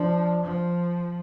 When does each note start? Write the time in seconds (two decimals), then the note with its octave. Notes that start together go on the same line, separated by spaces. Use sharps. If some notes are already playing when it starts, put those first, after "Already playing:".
Already playing: F3 D4
0.42 F3